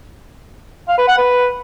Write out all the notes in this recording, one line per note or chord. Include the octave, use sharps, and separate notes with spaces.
F5
B4
F#5
B4